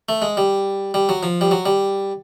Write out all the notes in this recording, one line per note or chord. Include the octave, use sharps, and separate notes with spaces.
A3
G#3
G3
G3
F#3
F3
G3
F#3
G3